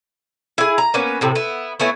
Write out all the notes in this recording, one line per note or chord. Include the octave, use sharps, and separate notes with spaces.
E4 G#4
A#5
A#3 B3 C#4 B4
A2 C3
B3 E4
A3 B3 C#4 E4